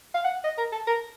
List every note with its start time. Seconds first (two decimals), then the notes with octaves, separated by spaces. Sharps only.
0.14 F5
0.24 F#5
0.44 D#5
0.58 A#4
0.72 A4
0.87 A#4